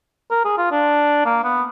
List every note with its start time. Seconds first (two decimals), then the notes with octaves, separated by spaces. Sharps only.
0.31 A#4
0.45 G#4
0.58 F4
0.72 D4
1.26 A#3
1.44 B3